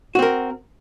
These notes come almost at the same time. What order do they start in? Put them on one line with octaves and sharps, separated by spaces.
F#4 C4 A#4